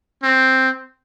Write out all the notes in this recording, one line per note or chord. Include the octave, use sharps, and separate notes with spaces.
C4